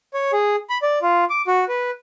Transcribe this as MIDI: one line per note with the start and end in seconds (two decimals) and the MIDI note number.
0.14 0.32 73
0.33 0.56 68
0.70 0.78 83
0.82 0.99 74
1.02 1.24 65
1.30 1.42 86
1.47 1.65 66
1.69 1.90 71